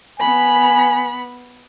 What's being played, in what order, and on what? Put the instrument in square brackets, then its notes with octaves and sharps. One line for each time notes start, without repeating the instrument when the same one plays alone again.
[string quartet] B3 B5 [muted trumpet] G#5